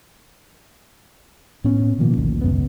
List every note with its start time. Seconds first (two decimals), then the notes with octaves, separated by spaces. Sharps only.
1.64 A2 B3 C#4
1.99 B2 D#3 F3 A#3
2.17 G#1 D2
2.41 C#2 F#2 B3